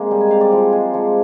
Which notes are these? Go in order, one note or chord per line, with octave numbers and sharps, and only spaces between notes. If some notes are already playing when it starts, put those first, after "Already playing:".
Already playing: G#3 A#3 C4 F5
G3 D#5
G#5
C4 F5
D5
F3
G#3 G#4
F3